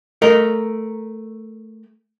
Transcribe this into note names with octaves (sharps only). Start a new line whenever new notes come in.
A3 A#4 D#5